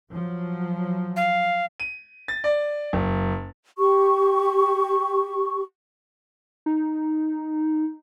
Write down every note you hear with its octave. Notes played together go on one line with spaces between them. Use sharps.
F3 F#3
F5
D#7
A6
D5
F#1
G4 C#6
D#4